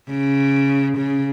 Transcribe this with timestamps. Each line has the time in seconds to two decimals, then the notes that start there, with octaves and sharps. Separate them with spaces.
0.09 C#3
0.98 C#3